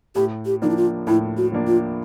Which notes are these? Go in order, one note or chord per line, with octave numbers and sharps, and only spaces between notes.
A2 G4
G4
F3 A#3 D4 D#4
E4
F4
A2 E4
F#4
F3 A#3 D4
F4